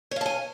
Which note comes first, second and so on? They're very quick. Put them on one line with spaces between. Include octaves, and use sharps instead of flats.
C#5 F5 A5 G#5